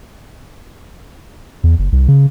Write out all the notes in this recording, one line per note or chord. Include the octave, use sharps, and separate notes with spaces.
E2
F#1
C2
C#3